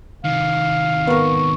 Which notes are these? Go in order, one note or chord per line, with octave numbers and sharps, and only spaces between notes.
C3 D#3 F5
B3 A#4 C#6